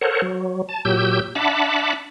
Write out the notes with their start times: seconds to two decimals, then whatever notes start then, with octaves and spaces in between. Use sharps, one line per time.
0.01 A4 A#4 C5 C#5 F#5
0.22 F#3
0.69 A5
0.85 A#2 F#3 G4 E6 G6
1.35 D4 E5 F#5 A5 B5 D6